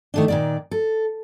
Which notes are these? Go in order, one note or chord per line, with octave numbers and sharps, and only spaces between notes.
D#3 A3 D4
A#2 D#3 D5
A4